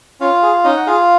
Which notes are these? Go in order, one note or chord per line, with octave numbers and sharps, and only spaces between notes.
C#4 F4 F5
G#4
C#4 D#4 D#5
F#5
F4 G#4 F5